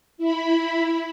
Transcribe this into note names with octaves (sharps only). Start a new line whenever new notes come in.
E4 B5